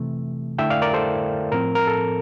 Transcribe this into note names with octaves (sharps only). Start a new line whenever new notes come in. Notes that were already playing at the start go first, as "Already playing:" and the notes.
Already playing: C3 E3 A3
D3 A3 E4 E5 G5
D5 F5
A#4 D5
A4 C5
A2 F3 C4 A#4
A#4
A4